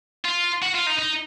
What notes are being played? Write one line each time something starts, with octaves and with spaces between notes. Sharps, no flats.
F4
F#4
F4
D#4
D#4